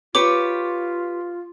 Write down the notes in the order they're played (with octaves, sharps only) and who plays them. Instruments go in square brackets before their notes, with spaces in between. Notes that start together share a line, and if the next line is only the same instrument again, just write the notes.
[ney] F4 [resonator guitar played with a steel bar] G4 B4 C#5 [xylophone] D6